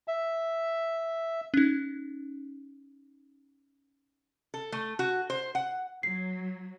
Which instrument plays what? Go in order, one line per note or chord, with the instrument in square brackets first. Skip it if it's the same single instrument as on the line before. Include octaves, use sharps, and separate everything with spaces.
[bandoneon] E5
[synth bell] C#4 D#4
[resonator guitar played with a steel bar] A4
A3
F#4
C5
F#5
[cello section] F#3 [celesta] C7